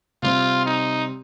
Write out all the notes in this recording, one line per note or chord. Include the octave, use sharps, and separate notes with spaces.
C3 G3 C4 F4
D#4